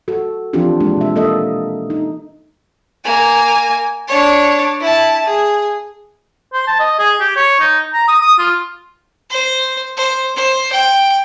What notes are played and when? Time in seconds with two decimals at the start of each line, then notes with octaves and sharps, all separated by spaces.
0.08 F#4 A4
0.53 E3 F3 C4 D4 F4 G4
0.80 G#3 A#3 D4
0.97 B2 E5
1.16 A#3 A4 D#5 E5
1.90 D#4
3.04 A#3 G#5
4.08 D4 C#5
4.80 E4 A5
5.26 G#4
6.53 C5
6.67 A5
6.79 D#5
6.99 G#4
7.20 G4
7.36 C#5
7.60 D#4
7.93 A#5
8.08 D#6
8.22 D#6
8.39 F4
9.31 C5
9.97 C5
10.36 C5
10.72 G5